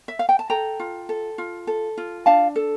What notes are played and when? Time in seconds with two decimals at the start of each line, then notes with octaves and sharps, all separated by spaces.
0.08 E5
0.19 F5
0.29 G5
0.39 A5
0.50 A4 G5 A#5
0.80 F4
1.09 A4
1.38 F4
1.67 A4
1.98 F4
2.26 D4 F5 A5
2.56 A4